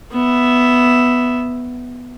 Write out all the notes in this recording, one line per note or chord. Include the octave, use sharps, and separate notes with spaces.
B3 E5